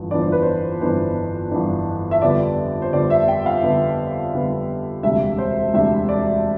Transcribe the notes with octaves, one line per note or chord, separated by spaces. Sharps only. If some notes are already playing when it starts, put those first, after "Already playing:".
Already playing: G1 F2 E3
G1 F2 E3 B3 D4 D5
C5
B4
C5
G1 F2 E3 B3 D4 C5
G1 F2 E3 B3 D4
E5
F2 D3 G3 B3 D5
C5
F2 D3 G3 B3 D5
E5
G5
F5
F2 D3 G3 B3
F2 D3 G3 B3
E1 D2 C3 G3 D4 E5
C5
E1 D2 C3 G3 D4 E5
D5